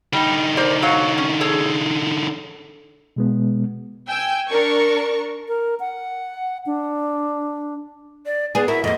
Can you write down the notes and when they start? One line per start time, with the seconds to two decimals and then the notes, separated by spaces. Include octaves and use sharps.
0.13 D3 G3 D#4
0.57 A#4 C5 D5
0.82 F#3 C#5 F5
1.18 C#4
1.41 G#4 A4 C#5
3.16 B2 G#3 B3
4.09 G5 G#5 E6 G6
4.49 D4 A#4 C#6
5.48 A#4
5.80 F#5
6.66 D4
8.26 D5
8.55 B3 G#4 D5
8.68 E4 F#4 A#4 E5
8.84 F2 A#3 D#5